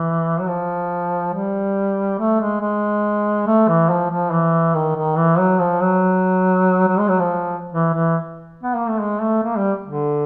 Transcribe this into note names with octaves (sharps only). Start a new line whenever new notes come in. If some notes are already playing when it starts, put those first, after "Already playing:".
Already playing: E3
F#3
F3
G3
A3
G#3
G#3
A3
E3
F3
F3
E3
D#3
D#3
E3
F#3
F3
F#3
F#3
G#3
F#3
F3
E3
E3
B3
A#3
A3
G#3
A3
A#3
G3
D3